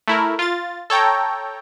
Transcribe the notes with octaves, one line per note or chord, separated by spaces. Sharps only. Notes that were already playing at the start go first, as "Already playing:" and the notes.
A3 E4 A#4
F4 A6
A4 C#5 G5 A#5